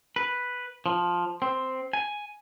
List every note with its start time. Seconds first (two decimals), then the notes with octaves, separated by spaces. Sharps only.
0.16 B4
0.86 F3
1.42 C4
1.93 G#5